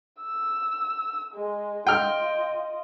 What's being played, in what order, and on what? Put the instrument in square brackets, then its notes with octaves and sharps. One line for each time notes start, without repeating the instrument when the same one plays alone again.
[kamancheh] E6
G#3
[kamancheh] F4 D#5 [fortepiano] G5 F6